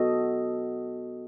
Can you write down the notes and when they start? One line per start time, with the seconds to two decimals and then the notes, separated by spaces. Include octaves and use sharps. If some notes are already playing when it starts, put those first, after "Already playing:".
Already playing: B3 F#4 A4 D#5